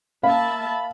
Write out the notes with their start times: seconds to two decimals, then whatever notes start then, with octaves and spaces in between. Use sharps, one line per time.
0.23 A#3 E5 F5 A5 B5